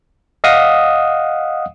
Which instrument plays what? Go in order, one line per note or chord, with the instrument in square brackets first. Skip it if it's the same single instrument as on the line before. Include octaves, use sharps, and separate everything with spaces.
[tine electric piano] D#5 F5 F#5 D#6